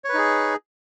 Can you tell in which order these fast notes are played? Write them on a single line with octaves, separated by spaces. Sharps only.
C#5 B4 D#4 G#4